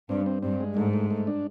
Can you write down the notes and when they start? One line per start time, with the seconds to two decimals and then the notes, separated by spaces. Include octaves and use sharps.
0.09 G2 C4
0.26 C4
0.43 G2 C4
0.60 G#3
0.76 G#2 A3
0.93 A3
1.11 A3
1.27 D4